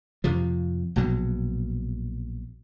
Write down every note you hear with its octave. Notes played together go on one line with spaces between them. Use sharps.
F2 C3 F3
A#1 B2 F#3